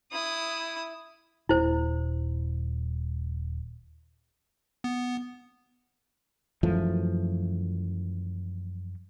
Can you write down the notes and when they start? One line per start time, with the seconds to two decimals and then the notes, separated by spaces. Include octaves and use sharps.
0.12 E4 D#6
1.49 D#1 E4 C5
4.84 B3
6.63 F#2 E3 F3 A3